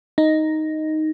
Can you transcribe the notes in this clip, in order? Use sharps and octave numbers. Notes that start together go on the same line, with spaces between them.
D#4